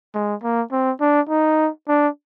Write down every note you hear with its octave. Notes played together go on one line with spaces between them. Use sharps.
G#3
A#3
C4
D4
D#4
D4